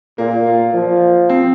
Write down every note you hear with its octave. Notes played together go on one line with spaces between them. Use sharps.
A#2 A#3
F4
F3
C4